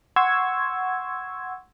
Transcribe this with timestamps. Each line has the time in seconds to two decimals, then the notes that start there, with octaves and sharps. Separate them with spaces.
0.16 F#5 C6 C#6 E6 G#6